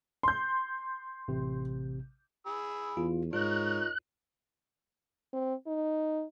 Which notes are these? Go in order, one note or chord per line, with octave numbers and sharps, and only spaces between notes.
C6 G6
A1 C3
G#4 B5 E6
E2 F4
G#2 D#4 F4 A#4 C#5 F#6
C4
D#4